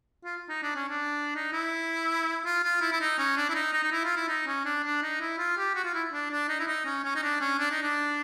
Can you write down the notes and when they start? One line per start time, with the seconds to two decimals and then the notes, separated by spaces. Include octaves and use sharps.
0.24 F4
0.49 D#4
0.63 D4
0.75 C#4
0.89 D4
1.35 D#4
1.53 E4
2.45 F4
2.63 F4
2.81 E4
2.92 E4
3.01 D#4
3.18 C#4
3.37 D4
3.49 E4
3.55 D#4
3.73 D#4
3.83 D#4
3.92 E4
4.05 F4
4.16 E4
4.28 D#4
4.47 C#4
4.65 D4
4.84 D4
5.03 D#4
5.21 E4
5.38 F4
5.57 G4
5.75 F#4
5.84 F4
5.94 E4
6.13 D4
6.31 D4
6.49 D#4
6.60 E4
6.67 D#4
6.85 C#4
7.04 C#4
7.15 D#4
7.23 D4
7.40 C#4
7.59 D4
7.71 D#4
7.83 D4